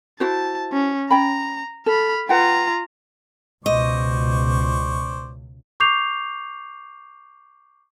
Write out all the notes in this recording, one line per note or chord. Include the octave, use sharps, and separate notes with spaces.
E4 F#4 C5 A5
C#4
C#4 G5 A#5 B5
A4 B5 F6
F4 B4 F#5 G5 A#5
C#2 B2 C5 D5 D#5 C#6
C#6 D6 G6 C7 F7